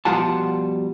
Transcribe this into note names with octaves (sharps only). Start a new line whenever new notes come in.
B2 F3 G3 F4 F#5 A5